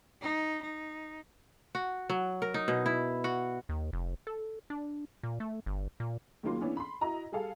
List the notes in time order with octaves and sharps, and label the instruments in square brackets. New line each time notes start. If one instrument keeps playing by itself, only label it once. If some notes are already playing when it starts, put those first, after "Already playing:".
[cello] D#4
D#4
[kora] F#4
F#3
A#4
D#4
B2
E4
F#4
[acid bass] D#2
F1
A4
D4
A#2
A3
G1
A#2
[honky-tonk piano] C#2 D#3 F#3 A#3 F4 C6
E3 B3 C#4 D4
B5 C6
E4 F#4 D#5 A#5
G3 G#4 A4 F5 A5